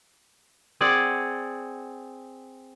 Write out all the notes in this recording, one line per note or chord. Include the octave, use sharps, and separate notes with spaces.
C4 G#4 D5 F#5